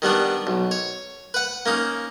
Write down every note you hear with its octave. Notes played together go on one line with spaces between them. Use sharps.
D#3 G3 B3 D4
B1
C#5
B4 F#5
A#3 C#4 D#4